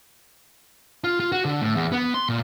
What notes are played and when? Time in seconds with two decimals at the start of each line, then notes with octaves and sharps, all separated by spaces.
1.04 F4
1.20 F4
1.32 F#4
1.45 D3
1.61 A2
1.75 E2
1.92 B3
2.14 C6
2.29 A#2